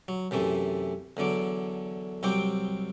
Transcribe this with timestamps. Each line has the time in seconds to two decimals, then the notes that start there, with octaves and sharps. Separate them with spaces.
0.08 F#3
0.31 F#2 C3 E3 A3
1.17 E2 D3 F#3 D6
2.23 C2 F#3 C4 C5 G5 D6